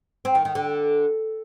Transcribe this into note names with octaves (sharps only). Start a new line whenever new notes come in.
C4
D#3
D#3
D3